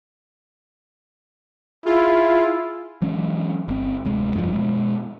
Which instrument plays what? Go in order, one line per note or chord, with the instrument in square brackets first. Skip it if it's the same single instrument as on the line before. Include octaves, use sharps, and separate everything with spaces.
[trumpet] E4 [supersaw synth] F4 [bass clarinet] G#4
[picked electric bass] E3 F#3 G#3 C#4
G1 C4
D1 C3 G#3
F1 G2 C3 F3
B2 G#3